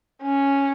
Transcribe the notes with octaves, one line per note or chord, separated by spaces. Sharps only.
C#4